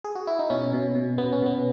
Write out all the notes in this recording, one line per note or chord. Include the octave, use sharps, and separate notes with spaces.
G#4
F#4
E4
D#4
B2 C#4
B2
B2
B2 B3
C#4
B2 B3